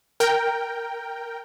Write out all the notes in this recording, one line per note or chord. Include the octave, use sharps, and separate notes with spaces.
A#4 G5